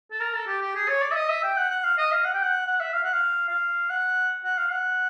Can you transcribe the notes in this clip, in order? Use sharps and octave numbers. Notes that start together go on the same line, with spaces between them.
A4
A#4
A4
G4
G4
G#4
C#5
D5
E5
D#5
E5
G5
F#5
F#5
F5
D#5
F5
F#5
G5
F#5
F#5
E5
F5
F#5
F5
F5
F#5
F#5
F5
F#5